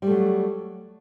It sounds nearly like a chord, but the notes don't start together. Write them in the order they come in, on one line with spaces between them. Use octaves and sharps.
G3 A3 F#3